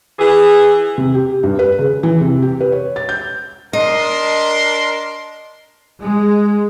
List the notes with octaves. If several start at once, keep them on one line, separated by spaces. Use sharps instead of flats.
E3 G#4
C3
G4
G2
B4
C#3
E3
C3
G4
B4
C#5
A6
G6
D4 A#4 D#5 C6
G#3